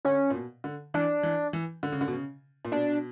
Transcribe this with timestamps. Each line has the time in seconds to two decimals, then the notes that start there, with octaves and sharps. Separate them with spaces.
0.05 D3 C#4
0.30 A#2
0.34 B2
0.64 D3
0.94 E3 D4
1.23 E3
1.53 E3
1.83 D3
1.92 C#3
2.01 D3
2.08 B2
2.13 C#3
2.65 A#2
2.72 B2 D4